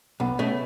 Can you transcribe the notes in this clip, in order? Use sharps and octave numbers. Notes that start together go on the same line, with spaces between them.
B1 B3
B2 A3 C#4